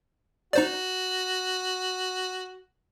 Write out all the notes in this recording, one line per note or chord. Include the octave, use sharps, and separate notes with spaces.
D#4 F#4 C5 D5